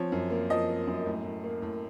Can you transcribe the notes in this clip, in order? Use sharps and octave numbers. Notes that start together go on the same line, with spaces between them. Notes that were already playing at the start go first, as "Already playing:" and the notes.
Already playing: F3 C4 C#5
F#2
A#3
F3 D#5
A#3
F#2
A2
A2
A#3
A2